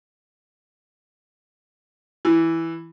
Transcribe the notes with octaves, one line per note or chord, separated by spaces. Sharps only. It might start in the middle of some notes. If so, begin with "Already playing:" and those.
E3